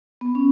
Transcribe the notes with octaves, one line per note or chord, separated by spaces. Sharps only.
B3
C#4